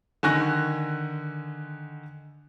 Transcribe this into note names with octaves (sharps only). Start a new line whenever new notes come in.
D3 D#3 G#5 C#6 F#6 A#6